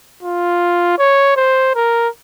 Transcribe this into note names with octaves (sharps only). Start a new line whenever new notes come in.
F4
C#5
C5
A#4